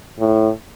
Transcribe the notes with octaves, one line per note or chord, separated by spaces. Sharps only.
A2